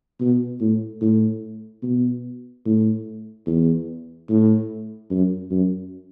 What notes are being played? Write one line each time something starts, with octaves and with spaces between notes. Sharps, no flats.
B2
A2
A2
B2
A2
E2
A2
F#2
F#2